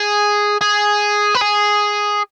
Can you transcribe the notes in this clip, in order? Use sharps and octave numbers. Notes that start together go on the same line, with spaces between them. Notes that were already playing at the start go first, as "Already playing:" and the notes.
Already playing: G#4
G#4
B4
G#4